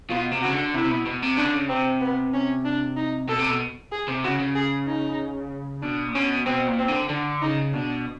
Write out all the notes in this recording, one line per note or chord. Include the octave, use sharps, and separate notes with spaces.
B2 F4
C3
C#3 F#4
D3
C3 E4
C3
B2
B2
C3
C#3 D4
D3
C#3
C3 C4
B3
C#4
D4
D#4
B2 A4
C3
B2
G#4
C3
C#3 F#4
C#3
G#4
D#4
B2 D4
A#2
B2 C#4
B2 C4
A#2
C4
D3
D3 D4
C#3 D#4
B2 D4